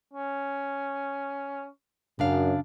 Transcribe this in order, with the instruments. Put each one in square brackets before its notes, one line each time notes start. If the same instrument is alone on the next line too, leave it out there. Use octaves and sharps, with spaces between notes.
[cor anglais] C#4
[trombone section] F#2 [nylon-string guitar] C#3 D4 F5